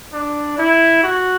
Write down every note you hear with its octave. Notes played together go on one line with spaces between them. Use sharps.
D4
E4
F#4